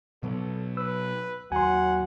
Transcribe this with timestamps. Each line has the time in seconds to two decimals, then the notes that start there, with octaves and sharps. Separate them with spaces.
0.23 B2 F#3 B3 A4
0.77 B4 E6
1.52 D#2 F#3 F#5 G#5 A#5 C6